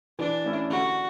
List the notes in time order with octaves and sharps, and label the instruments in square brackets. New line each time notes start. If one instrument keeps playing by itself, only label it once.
[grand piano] E3 [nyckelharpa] D4
[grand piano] A3 C#4 E4
[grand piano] D3 [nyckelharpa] F#4